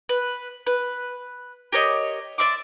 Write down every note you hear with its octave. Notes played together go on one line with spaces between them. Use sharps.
B4
B4
G4 A#4 C#5 D#5
D5 E5 C6 D6